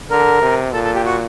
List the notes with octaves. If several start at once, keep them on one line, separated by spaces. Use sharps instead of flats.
D3 A#4
C3
A#2 A4
A4
G4
F#4